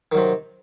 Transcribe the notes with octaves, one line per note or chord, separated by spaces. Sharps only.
C3 D#3 F#3